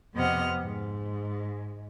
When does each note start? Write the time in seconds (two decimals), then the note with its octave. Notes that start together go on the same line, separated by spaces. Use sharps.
0.14 F2 C3 B3 D#5 F#5 F6
0.60 G#2